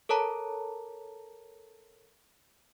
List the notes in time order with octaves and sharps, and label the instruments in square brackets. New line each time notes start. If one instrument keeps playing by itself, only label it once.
[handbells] A4 A#4 C#5 A5 A#5